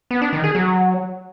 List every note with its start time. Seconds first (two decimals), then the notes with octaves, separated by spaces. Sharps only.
0.11 B3
0.22 D4
0.33 D#3
0.44 G#4
0.55 F#3